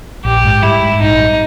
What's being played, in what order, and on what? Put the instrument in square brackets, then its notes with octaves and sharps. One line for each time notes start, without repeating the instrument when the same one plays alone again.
[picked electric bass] A#1 [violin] G4
[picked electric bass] G#2
[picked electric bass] G3 [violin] E4
[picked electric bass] G#2
[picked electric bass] A#1 [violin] D#4
[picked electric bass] G3